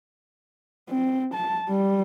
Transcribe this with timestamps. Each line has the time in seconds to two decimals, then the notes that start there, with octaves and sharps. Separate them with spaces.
0.90 C4
1.34 A5
1.69 G3